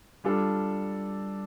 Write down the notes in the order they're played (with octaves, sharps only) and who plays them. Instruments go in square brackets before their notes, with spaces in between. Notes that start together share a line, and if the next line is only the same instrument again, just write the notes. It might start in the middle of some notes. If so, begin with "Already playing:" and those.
[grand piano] G3 D4 F4 A4